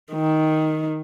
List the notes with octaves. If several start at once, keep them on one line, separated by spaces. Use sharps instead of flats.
D#3